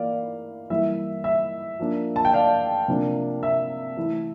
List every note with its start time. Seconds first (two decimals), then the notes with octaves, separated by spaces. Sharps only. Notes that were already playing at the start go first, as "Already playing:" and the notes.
Already playing: E3 A#3 D5 F5
0.70 E3 G3 A#3 E4 E5
1.24 E5
1.80 F3 A#3 D4
2.16 A5
2.25 G5
2.33 D5 F5
2.88 C3 F3 A#3 D4
3.43 E5
3.97 E3 A3 E4